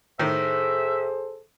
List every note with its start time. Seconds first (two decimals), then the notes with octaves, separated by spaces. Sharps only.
0.19 A2 D#3 G#4 A4 C5 E5